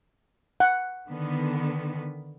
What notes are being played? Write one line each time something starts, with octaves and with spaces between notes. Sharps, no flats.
F#5
D3 D#3 B3